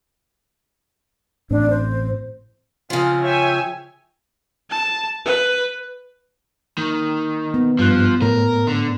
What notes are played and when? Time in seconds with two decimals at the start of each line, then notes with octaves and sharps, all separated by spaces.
1.51 A1 A2 C4 D4
1.70 C5
2.90 C#3 F3 C4 F5
3.23 C#5 E5 G5 G#5
4.70 A5
5.25 B4
6.78 D#3 A#3
7.54 B3
7.79 G2 F3 F#6
8.22 A2 A#4
8.67 D3